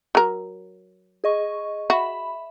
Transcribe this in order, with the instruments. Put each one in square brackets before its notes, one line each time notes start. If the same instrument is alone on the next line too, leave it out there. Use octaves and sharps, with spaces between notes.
[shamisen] F#3 A#4
[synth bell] G#4 D#5 C#6
[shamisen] F#4 [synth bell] E5 B5